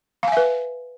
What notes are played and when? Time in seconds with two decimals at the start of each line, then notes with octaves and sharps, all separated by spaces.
0.23 F5
0.28 G#5
0.32 E5
0.37 B4